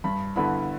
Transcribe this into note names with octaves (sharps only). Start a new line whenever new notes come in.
G2 B5
D3 B3 E4 B5